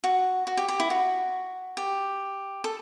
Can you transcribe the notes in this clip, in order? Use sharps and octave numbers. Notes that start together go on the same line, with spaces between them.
F#4
F#4
G4
G4
E4
F#4
G4
A4